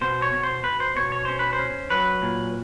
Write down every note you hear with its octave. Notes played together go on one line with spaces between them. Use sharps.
B2 C5
C#5
B2
C5
B2 B4
C5
B2 C#5
C#5
C#4 C5
B4
C5
C#4
F#3 B4
A#2